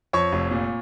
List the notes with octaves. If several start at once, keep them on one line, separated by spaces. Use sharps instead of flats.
F2 C#5 C#6
F1
A#2